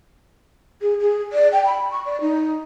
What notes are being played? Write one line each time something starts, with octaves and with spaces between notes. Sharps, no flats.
G#4
G#4
D5
G5
B5
C#6
D5
D#4